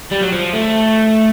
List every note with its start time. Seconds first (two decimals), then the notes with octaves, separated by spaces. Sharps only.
0.12 G3
0.22 F#3
0.33 F3
0.53 A3